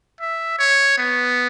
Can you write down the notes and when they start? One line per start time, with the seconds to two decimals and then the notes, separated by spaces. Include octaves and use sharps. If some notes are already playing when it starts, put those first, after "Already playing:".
0.21 E5
0.59 C#5
0.98 B3